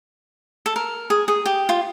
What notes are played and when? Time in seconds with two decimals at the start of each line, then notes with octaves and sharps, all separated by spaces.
0.66 A4
0.76 A#4
1.10 G#4
1.28 G#4
1.46 G4
1.69 F4